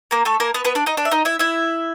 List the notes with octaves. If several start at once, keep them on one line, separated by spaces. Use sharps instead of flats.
A#3 A#4
A3 A4
A#3 A#4
B3 B4
B3 B4
D4 D5
D#4 D#5
D4 D5
E5
D#4 D#5
E4 E5
E4 E5